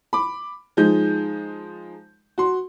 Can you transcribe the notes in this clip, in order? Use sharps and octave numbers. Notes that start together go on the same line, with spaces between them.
B5 D6
F3 G#3 D#4 G6
F#4 C6